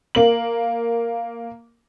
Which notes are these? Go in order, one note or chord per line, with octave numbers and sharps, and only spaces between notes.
A#3 F#7